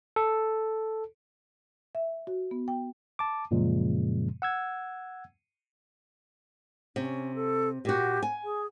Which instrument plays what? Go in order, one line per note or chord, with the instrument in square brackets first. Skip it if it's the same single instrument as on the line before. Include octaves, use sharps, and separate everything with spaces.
[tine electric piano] A4
[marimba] E5
F#4
B3
G5
[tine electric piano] A5 D6
F#2 A#2 C#3 F3 G#3
F#5 E6 G#6
[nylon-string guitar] C3 [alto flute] C#4
[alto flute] A4
[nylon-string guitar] A#2 F#4 [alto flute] G4
[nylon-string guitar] G#5
[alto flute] G#4